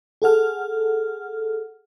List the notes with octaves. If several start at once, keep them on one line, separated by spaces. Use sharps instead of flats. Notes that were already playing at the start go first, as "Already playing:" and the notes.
G#4 A4 F#5 F6